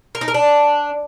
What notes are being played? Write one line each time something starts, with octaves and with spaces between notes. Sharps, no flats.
A#4
D#4
A#4
D4